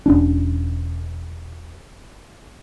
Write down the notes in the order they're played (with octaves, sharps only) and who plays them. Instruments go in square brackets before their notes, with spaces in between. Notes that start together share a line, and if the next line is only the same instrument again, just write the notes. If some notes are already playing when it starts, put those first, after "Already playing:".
[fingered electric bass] E1 C#4 D4